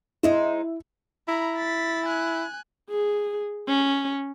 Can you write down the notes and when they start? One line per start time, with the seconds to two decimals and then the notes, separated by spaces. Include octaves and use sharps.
0.23 G#3 D#4 E4 C5
1.28 E4 A#5 B5
1.56 A6 B6
2.06 G#5 F#6
2.90 G#4
3.68 C#4